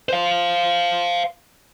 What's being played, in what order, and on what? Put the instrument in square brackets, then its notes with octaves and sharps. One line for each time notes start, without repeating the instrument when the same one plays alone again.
[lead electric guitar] C5 F5